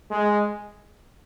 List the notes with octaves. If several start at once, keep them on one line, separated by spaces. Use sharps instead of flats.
G#3